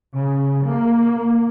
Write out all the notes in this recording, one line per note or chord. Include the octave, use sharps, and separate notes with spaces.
C#3
A#3